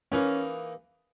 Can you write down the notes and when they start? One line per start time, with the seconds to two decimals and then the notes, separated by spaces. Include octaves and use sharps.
0.12 E3 A#3 C#4 D#4 G#4 B4